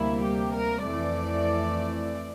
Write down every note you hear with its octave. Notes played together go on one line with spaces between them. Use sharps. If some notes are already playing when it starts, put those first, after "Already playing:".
Already playing: D2 C3 G3 A#3 E4
G4
A#4
F2 E3 A3 D5